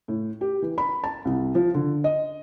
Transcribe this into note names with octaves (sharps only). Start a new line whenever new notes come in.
A2
G4
E3
B5
A5
C2
F3
D3
D#5